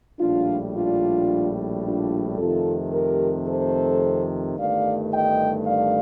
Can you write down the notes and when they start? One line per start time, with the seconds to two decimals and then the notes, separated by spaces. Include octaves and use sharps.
0.19 A#1 A2 G3 D4 F4
0.74 D4 F4
1.84 D4 F4
2.38 F2 C3 D#3 A3 F4 A4
2.93 G4 A#4
3.48 A4 C5
4.57 G1 G2 D#3 A3 D5 F5
5.12 D#5 G5
5.67 D5 F5